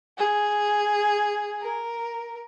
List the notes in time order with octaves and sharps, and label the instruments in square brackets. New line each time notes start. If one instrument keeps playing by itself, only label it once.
[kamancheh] G#4
A#4